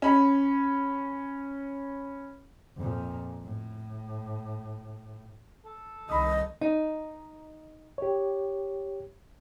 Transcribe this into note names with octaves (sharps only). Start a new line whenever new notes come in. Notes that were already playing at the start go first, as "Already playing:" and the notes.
C#4 B5
F2 A#2
A2
A4
C2 D#3 D#5 B5 D#6
D#4
G4 C#5